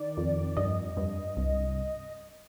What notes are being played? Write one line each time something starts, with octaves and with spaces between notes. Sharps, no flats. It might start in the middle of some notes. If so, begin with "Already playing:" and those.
Already playing: D#3 D5
F2
G2 D#5
G2
C2